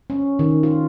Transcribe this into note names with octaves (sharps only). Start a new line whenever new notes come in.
C#4
D#3
F4